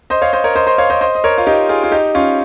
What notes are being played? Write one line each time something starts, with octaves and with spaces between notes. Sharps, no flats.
C5 D#5
C#5 F5
C5 D#5
A#4 C#5
C5 D#5
C5 D#5
C#5 F5
C5 D#5
C5 D#5
D#5
A#4 C#5
F4
D#4 G4
F4 G#4
F4
D#4 G4
C#4 F4